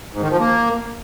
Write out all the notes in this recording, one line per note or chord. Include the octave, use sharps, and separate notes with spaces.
G#2
D#3
F3
A#3